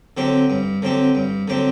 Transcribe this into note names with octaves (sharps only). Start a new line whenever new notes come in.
D3 F#3 C4 G4
G2
D3 F#3 C4 G4
G2
D3 F#3 C4 G4